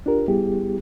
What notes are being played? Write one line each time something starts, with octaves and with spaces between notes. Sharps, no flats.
D4 F4 G4 A#4
G3 B3 E4 G4 G#4